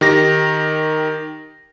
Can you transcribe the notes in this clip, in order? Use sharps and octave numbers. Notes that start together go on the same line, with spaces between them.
D#3 G4 A#6